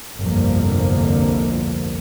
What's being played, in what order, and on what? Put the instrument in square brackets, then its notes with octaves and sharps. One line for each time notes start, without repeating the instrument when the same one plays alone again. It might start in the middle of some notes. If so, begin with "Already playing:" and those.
[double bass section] G1 C2 F2 D3 F3 A#3